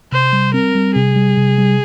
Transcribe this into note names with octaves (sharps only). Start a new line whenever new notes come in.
C3 C5
G3
C4 A#4
G3
C3 G#4
G3
C3
G3